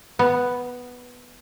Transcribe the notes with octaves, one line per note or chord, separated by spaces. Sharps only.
B3